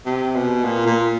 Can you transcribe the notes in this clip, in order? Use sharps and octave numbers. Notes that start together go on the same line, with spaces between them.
C3
B2
A#2
A#2